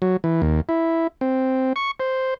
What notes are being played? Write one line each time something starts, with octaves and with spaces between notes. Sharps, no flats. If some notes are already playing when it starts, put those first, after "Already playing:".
F#3
E3
D#2
E4
C4
C#6
C5